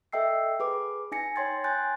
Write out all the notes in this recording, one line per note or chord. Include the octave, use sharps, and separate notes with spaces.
A4 D#5 E5 G5 E6 C7
G#4 B4 D6
D#4 G#5 A#6 C#7
C#5 G5 C6 G#6 A6
G#5 C6 F#6 G6 A6